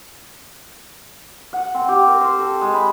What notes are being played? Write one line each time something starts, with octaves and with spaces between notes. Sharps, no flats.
F#5
C4
G4
A#4
C5
A4
G#3
B5